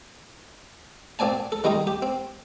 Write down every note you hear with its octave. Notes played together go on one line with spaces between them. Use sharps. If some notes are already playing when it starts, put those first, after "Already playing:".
A#2 C4 D5 G#5 A5
A4
D#3 G3 G#3 D#4
G4
C4